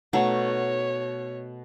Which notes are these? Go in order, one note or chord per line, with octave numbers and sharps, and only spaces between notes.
B2 A3 D#4 C#5 F#5 A#5 C#6